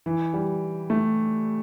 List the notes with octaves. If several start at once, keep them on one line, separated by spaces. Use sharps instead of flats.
E3
G3
A3